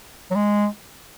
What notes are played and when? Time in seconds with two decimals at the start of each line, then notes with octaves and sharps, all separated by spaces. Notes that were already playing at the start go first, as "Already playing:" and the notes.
0.31 F#3
0.35 G#3